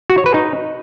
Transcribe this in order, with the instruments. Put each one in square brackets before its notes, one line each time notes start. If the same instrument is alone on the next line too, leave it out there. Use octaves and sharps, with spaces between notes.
[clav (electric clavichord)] F#4
C#5
B4
D#4